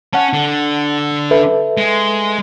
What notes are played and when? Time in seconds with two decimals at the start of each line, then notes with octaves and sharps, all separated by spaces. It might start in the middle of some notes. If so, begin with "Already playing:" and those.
0.13 C#4 F#5 A5
0.33 D3
1.31 A4 B4 E5
1.78 G#3